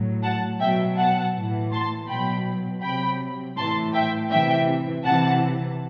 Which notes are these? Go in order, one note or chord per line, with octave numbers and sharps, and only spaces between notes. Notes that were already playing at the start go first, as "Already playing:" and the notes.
Already playing: A2 F#3
F#5 A5
B2 F#3 E5 G5
F#5 A5
A2 E3
A5 C6
B2 F#3 G5 B5
C3 F#3 G5 B5
A2 E3 A5 C6
E5 G5
C3 E3 E5 G5
C3 E3 F#5 A5